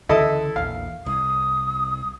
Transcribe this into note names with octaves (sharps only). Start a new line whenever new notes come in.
C#2 D3 E3 E4 A4 D#5
A#1 E2 F5
C2 D#6